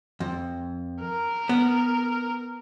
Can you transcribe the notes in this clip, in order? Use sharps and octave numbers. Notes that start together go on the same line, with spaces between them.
F2
A#4
B3